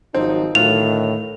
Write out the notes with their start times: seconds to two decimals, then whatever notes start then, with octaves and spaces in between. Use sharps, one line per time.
0.15 G#1 F3 F#3 C4 D#4
0.55 A2 D3 D#3 F#3 F4 F7